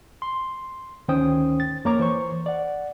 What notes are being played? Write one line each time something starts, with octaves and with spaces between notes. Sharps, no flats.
C6
D2 D#3 C#4 C5 G5 D#6
A6
F2 A#3 A#4 C#5 A#5 D6
E3 C5 C#6
D5 F#5